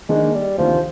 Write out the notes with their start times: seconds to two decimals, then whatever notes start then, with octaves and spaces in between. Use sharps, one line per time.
0.09 D#3 G#3 A#3 D4
0.34 G3
0.58 D2 C3 D#3 F3